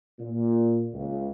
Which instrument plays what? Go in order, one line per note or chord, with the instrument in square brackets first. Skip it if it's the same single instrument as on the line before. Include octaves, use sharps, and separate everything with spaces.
[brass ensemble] A#2
C#2